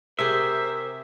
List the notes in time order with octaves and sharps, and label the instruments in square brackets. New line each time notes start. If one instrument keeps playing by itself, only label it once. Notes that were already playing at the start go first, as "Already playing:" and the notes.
[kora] C3 G4 G#4 [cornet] A#4 [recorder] C5 [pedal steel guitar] E5